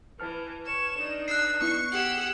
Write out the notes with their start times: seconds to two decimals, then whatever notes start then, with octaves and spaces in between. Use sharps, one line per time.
0.20 E3 B4 A5 F6
0.65 C#5 E7
0.95 D4 D#4
1.28 E6 F#6 C7
1.61 B3 E4 C#6
1.92 G4 G#4 F#5 E6